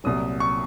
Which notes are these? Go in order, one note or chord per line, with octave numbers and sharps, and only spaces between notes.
C2 A#2 F#3 D#6
C#6